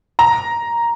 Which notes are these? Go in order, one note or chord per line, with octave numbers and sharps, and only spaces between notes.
A#5